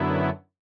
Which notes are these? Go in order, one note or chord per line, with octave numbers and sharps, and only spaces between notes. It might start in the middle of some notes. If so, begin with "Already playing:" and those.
Already playing: F#2 D3 F#3 B3 E4